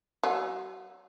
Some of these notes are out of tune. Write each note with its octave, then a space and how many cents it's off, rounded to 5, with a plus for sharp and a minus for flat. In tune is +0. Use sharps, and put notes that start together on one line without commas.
F#3 +35 F#5 -35